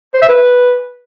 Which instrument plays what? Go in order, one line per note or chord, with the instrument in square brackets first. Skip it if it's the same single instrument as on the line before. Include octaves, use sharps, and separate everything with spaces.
[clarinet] C5
E5
B4